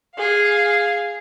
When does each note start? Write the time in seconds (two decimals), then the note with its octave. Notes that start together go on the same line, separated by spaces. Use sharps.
0.16 G#4 F5